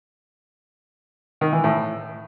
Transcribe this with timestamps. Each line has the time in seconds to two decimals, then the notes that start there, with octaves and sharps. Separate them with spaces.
1.41 D#3
1.53 E3
1.64 A2